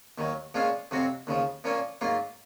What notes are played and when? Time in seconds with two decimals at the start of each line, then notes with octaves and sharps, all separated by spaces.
0.18 D#2 D#3 F#3
0.54 A#2 F3 G#3 C#4 F4
0.91 F2 C3 F#3 C4 F#4
1.27 D#2 C#3 F3
1.64 A#2 F3 A#3 C#4
2.01 G#2 F#3 A#3 F4